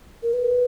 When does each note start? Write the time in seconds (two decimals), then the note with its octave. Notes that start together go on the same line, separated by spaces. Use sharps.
0.23 A#4
0.33 B4